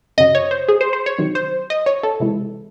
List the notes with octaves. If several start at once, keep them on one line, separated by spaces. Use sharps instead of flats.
F#2 C#3 F#3 D#5
C#5
C5
G#4
C5
C5
C#5
C3 D#3 F#3
C5
D#5
C#5
A4
C3 E3 G#3